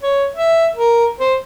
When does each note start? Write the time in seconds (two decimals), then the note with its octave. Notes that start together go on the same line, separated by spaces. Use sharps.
0.03 C#5
0.36 E5
0.76 A#4
1.20 C5